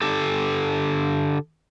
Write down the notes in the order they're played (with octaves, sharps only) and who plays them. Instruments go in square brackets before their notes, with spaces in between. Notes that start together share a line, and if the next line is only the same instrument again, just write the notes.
[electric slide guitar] D3 G4 A4